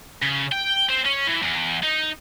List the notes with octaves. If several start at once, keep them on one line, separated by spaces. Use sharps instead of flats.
C#3
G5
C4
C#4
E3
E2
D#4